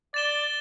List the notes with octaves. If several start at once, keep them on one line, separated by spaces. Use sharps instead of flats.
D5 A6 E7 G7